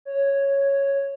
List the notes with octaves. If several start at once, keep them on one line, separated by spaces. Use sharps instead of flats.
C#5